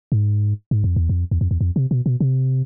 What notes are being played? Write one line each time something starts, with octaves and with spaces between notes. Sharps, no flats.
G#2
G#2
F2
E2
F2
E2
F2
E2
F2
C3
B2
B2
C3